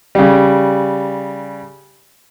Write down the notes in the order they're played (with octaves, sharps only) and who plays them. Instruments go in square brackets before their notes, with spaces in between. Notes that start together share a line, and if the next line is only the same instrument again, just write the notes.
[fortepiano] C#3 G3